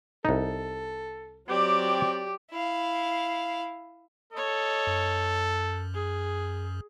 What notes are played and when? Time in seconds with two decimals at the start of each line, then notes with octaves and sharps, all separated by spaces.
0.25 C2 D#4 A4
1.49 F#3 C4 G4 D5
2.51 E4 F5
4.33 A4 C#5 D#5
4.87 F#2
5.94 G#4